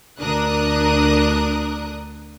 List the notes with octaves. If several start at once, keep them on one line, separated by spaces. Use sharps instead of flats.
D2 D4 A#4 D#6 F#6